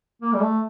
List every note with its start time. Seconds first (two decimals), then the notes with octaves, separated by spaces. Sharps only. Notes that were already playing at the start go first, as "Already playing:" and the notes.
0.22 A#3
0.33 G3
0.40 A3